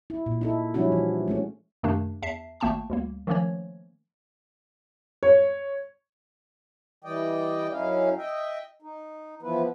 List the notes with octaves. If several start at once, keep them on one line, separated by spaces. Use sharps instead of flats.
E4
A#2
D#4 E4 A4
F3 G3 C#4 D4 E4 F#4
E3
G#3 A3 C#4
F#2 C3 D#3 A3 A#3 D4
E2 E5 A5 C7
G#1 A3 A#3 G5 A5 C#6
D2 G3 A#3
D#3 F3 A3 A#3 C#4 C#5
C#5
E3 G3 D5 D#5 G5
F#2 C#4 D#4 E4 F5
D#5 E5 G5
D#4
E3 F3 B3 E4 B4